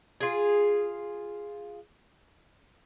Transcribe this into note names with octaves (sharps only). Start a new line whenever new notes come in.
F4 G#4